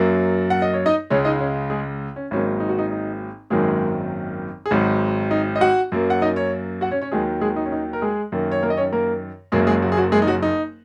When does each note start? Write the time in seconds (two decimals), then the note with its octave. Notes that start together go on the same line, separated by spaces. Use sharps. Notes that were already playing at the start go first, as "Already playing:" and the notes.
Already playing: F#2 F#3 A#3
0.50 F#5
0.62 D#5
0.73 C#5
0.86 D#4 D#5
1.10 C#2 C#3 G#3 C#4 C#5
1.25 D#4 D#5
1.40 C#4
1.70 G#3 G#4
2.16 C#4
2.31 G#1 G#2 F#3 A#3 C#4
2.60 D#4
2.69 F#4
2.79 D#4
2.91 D#4
3.50 G#1 F#2 D#3 F#3 G#3 A#3 G#4
4.66 G#4
4.71 G#1 G#2 F#3 F#4
5.31 D#4
5.56 D#5
5.61 F#4 F#5
5.92 F#2 F#3 A#3
6.10 F#5
6.22 D#4 D#5
6.36 C#4 C#5
6.81 F#4 F#5
6.91 C#4 C#5
7.02 C#4 C#5
7.11 D#2 D#3 F#3 G#3 G#4
7.41 G#3 G#4
7.56 D#4
7.66 C#4
7.72 D#4
7.93 A#4
8.02 G#3 G#4
8.32 F#2 D#3 A#3
8.52 C#5
8.63 A#3 A#4
8.70 D#5
8.77 C#4 C#5
8.92 A#3 A#4
9.52 F#1 F#2 F#3 G#3 A#3 G#4
9.67 G#3 G#4
9.82 F#3 F#4
9.92 G#4
9.97 F#3 F#4
10.12 G#3 G#4
10.22 D#4
10.27 F#3 F#4
10.42 D#4